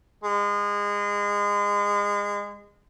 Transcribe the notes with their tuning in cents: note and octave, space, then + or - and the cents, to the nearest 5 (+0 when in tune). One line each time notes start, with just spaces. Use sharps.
G#3 -25